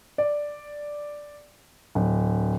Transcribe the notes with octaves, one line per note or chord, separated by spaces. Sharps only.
D5
D1